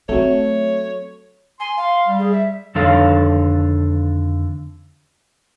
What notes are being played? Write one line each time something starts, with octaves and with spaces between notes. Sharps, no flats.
F#3 A3 C4 C#5
G#5 C6
F5
G3
G#4
E5
F2 D3 D#3 A4 C#5 F5